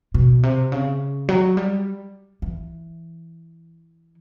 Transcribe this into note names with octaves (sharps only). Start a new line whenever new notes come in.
B2
C3
C#3
F#3
G3
E3